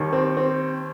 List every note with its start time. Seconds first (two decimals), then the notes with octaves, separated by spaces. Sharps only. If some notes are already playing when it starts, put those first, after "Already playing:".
Already playing: D#2 D#3 G3
0.13 C4
0.37 C4